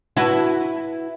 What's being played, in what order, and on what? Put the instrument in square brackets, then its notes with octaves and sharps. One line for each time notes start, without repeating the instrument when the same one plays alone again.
[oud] E4 F#4 B4